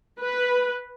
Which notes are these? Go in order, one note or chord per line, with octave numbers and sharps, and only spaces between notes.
B4